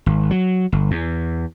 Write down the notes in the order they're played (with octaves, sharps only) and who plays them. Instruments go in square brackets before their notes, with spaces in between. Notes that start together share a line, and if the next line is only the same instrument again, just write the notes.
[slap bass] G#1
F#3
G1
E2